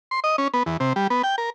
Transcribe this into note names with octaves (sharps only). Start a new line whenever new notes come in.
C6
D#5
C#4
B3
E2
C3
G3
B3
G5
A#4